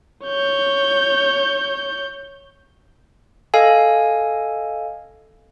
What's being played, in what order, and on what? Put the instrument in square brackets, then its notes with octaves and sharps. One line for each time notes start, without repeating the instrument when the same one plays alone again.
[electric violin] C#5 G6
[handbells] A4 D#5 F5 G#5